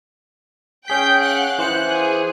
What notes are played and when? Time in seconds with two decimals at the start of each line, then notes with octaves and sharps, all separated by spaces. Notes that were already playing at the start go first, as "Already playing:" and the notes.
0.88 C#4 G#4 G5 G6 B6
1.22 F5 F#5 F#6
1.59 E3 C5 F#6 C#7
1.89 G#4